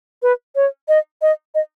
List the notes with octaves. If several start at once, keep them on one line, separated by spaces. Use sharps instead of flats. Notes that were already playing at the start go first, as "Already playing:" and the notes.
B4
C#5
D#5
D#5
D#5